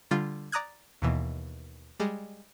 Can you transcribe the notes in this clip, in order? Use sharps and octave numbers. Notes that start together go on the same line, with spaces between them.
D3 G3 F4
D5 A#5 D#6 F#6 G#6
D#2 B2 E3
G3 G#3